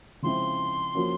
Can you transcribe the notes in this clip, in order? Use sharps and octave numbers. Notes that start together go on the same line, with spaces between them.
C#3 F3 G#3 C4 E4 C6
F3 A#3 C#4 F#4